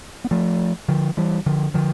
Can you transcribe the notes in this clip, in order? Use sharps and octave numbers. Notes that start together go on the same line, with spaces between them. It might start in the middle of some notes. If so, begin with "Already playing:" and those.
B3
F3 A3
D3 F3
E3 G3
D3 F3
D3 F3